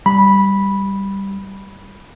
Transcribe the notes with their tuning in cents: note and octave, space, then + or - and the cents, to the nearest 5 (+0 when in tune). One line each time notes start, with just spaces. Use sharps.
G3 +0 B5 -10